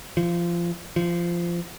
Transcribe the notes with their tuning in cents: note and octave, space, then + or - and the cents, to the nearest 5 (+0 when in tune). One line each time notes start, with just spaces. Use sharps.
F3 -20
F3 -15